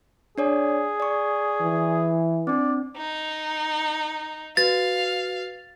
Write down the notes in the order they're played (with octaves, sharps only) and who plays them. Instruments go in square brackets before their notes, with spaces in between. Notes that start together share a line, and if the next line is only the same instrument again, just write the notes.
[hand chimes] D4 C#5 D5 [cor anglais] G#4
[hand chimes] D5 C#6
[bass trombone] E3
[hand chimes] C4 D4 [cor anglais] D5
[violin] D#4
[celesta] F#4 B4 [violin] F5 [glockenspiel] A6